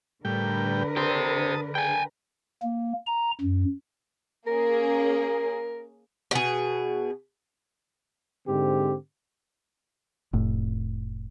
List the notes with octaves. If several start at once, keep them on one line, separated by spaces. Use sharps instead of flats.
A2 D3 G3 A#4 B4 G5
G4 C5 A5 D#6
G#4 G5 G#5
A#3
A#5
F#2
A#3 C#4 G#4 A#4
B2 G#4
G#2 D3 C4 G4
F1 A2